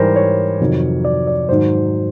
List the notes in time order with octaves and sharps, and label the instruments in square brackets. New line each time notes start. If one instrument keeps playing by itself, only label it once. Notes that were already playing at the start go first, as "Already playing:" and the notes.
Already playing: [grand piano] G#2 E3 G3 A#4 C5
C#5
F2 C3 D#3 F#3
D5
D5
G#2 D#3 F#3 C5